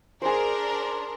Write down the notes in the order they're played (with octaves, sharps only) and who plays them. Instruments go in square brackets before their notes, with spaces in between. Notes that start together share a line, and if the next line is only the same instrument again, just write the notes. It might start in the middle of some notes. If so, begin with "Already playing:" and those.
[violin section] D4 A#4 [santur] G#4 C5